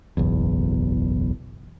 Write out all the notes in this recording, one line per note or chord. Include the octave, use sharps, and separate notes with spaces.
F#1 B1 E2